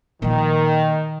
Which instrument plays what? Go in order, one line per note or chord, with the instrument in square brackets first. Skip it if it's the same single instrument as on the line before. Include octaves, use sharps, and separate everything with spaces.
[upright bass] A#2 F3 [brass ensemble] D#3